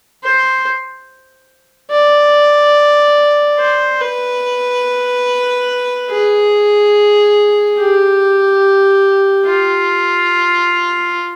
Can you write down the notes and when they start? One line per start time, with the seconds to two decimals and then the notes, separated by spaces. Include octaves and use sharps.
0.23 C5
1.91 D5
3.59 C5
4.01 B4
6.11 G#4
7.78 G4
9.45 F4